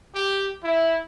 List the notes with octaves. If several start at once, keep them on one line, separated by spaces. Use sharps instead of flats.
G4
E4